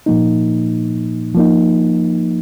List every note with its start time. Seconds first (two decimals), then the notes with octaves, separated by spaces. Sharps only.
0.06 A#2 F3 A#3 D#4
1.35 F3 A#3 D#4